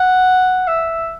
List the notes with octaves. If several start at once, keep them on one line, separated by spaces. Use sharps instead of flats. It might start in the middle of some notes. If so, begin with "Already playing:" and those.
Already playing: F#5
E5